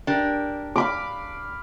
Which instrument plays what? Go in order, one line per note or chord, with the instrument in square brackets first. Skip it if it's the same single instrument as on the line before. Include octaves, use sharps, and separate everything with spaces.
[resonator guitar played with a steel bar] D4 G4 A#4
[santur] F5 B5 D6